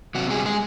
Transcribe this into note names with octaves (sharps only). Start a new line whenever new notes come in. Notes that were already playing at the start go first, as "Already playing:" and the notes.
C3 F#3 F#4
G#3 G#4
G3
G#3 G#4